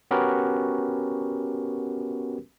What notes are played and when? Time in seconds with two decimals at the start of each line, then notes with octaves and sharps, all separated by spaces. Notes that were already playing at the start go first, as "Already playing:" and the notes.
0.11 B3 C#4 F#4 G4 A#4 B4